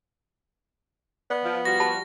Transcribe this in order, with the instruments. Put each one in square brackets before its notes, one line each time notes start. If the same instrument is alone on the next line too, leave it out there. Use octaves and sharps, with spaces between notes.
[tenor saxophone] B3 [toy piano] D5
[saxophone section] F3
[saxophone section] F3 G3 F#4 [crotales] A#6
[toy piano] G4 A5 B5